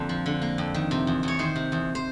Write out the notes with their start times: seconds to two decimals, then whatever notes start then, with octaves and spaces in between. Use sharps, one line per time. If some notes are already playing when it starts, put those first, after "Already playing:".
Already playing: F2 D3 A#3
0.09 F3
0.26 D3
0.42 A#3
0.58 F2
0.74 D#3
0.91 C3
1.07 E2
1.23 E2 C#5
1.39 D#3 C5
1.56 C3
1.72 E2
1.95 C5